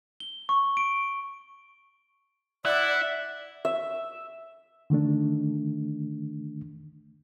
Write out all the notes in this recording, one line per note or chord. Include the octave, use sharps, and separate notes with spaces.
G7
C#6
D7
E4 D5 F#5
E5
D3 D#3 A3 D4